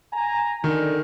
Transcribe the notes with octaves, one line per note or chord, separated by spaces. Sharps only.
G#5 A#5
D3 D#3